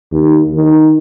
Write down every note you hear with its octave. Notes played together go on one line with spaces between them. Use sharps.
D#2
D#3